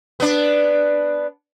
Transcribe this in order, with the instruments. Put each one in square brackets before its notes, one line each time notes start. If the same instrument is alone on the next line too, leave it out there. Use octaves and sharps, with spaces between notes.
[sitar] B3 D4